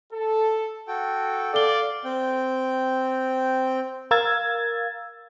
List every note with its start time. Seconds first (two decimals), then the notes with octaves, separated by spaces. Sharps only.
0.12 A4
0.88 F#4 A4 G5
1.54 A4 D5 F5 G7
2.05 C4 G5
4.11 A#4 F5 E6 G#6 A6